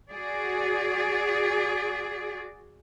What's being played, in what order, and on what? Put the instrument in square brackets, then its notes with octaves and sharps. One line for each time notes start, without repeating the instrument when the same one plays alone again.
[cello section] F#4 G#4 D5